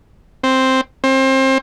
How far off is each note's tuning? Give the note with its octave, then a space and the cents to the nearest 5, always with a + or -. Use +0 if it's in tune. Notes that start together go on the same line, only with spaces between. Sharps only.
C4 +5
C4 +30